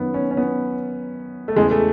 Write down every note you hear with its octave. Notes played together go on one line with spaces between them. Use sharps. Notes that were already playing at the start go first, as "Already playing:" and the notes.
Already playing: F#2 D#3 B3
C#4
C#4
B3
A3
E2 C#3 E3 G#3
A3